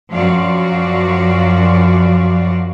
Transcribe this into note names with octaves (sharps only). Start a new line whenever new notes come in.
F#2 F3 F#3 F#4 D5 F5